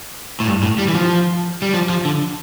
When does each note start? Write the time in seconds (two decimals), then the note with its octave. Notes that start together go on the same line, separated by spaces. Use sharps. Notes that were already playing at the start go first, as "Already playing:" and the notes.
0.40 A2
0.47 G2
0.63 A2
0.78 G3
0.88 E3
0.95 F3
1.62 G3
1.73 F3
1.89 F3
2.05 D3